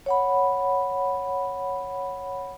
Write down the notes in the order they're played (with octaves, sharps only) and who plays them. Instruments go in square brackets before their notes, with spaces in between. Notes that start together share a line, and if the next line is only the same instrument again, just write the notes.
[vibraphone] C#5 F#5 B5